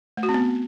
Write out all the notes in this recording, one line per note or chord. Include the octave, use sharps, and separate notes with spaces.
A3
F#4
C4
B3